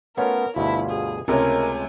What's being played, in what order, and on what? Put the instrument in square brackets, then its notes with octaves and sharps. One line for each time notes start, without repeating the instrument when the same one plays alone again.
[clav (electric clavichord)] A3 C#4 F4 [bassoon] B3 [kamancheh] A#4 [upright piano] C#5
[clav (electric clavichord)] D2 G2 B2 [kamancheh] E4 [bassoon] F4
[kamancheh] G#4
[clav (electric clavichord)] C#2 G#3 A3 [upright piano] C3 C#4 [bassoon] A#4 [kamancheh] G#5